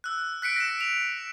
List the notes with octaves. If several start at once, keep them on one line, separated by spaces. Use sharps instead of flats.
E6 F#6
F#6 B6 C#7 D7
A#6 E7
F7